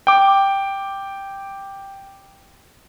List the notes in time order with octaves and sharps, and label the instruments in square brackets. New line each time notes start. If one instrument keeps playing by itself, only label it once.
[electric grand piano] G5 D6